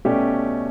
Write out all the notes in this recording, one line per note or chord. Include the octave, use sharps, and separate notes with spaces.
B2 A3 C#4 G4 D5